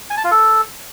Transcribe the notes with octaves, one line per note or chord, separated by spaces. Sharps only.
G#5
A5
F4
A4